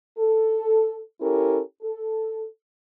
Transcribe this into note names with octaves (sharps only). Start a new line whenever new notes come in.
A4
C#4 E4 G4 A4 A#4
A4